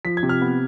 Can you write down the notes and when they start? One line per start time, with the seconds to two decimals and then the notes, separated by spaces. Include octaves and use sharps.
0.05 F3 B6
0.17 G#6
0.23 C3
0.29 F6
0.41 B3